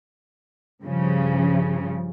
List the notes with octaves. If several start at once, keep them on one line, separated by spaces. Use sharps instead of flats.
G2 C#3 F3